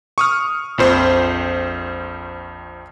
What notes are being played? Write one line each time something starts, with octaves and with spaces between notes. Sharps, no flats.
C#6 D#6 F6
A#1 F2 C5